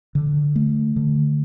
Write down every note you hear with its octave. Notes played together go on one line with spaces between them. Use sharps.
D3
A3
D3